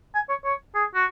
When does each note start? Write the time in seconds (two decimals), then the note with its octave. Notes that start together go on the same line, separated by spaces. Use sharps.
0.15 G#5
0.29 C#5
0.44 C#5
0.75 G#4
0.95 F#4